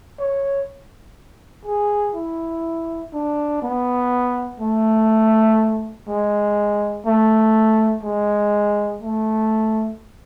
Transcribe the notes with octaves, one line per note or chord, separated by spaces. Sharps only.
C#5
G#4
E4
D4
B3
A3
G#3
A3
G#3
A3